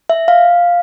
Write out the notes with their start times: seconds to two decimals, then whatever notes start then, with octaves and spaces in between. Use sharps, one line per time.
0.10 E5
0.28 F5